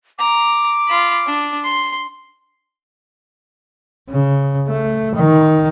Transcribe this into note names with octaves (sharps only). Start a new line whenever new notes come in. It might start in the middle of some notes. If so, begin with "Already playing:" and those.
A#5 D6
F4 B5
D4
C6
C#3
A3
D#3